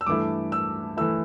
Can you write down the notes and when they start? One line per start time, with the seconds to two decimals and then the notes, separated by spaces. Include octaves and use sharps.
0.01 E6
0.06 G2 E3 A3 E4 D6
0.52 E6
0.97 E3 A3 E4 E6